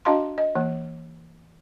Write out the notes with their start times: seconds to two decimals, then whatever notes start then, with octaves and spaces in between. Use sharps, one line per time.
0.05 D4 F#4 D#5 F5 A5 C6
0.38 D#5
0.55 E3 A#3